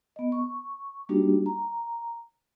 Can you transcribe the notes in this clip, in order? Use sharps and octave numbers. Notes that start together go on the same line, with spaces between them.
B3 D#5
C#6
G3 A#3 D4 D#4 F#4 G4
A#5